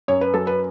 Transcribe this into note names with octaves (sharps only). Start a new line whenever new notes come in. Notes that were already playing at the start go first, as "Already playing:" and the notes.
F#2 C#5
B4
F#3 A4
B4